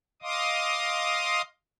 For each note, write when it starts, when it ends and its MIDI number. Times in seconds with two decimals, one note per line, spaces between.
0.22 1.42 75
0.22 1.42 77
0.22 1.42 84
0.22 1.42 86
0.22 1.42 87